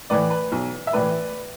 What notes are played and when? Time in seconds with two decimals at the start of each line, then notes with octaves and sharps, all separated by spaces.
0.10 A2 E3 B4 D5
0.30 B4
0.52 B1
0.87 E5
0.93 A2 E3 B4 D5